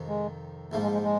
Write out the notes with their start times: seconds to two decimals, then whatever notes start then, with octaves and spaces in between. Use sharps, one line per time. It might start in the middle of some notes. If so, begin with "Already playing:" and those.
Already playing: F2 C3 D#3
0.08 G#3
0.72 A#1 G#2 F3 A3
0.83 G#3
0.93 G#3
1.04 G#3